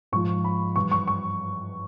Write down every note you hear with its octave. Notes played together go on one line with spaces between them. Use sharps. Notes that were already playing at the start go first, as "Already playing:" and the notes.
G#2 F3 G#3 C#6
B5
G2 E3 G3 C#6
C#6
C#6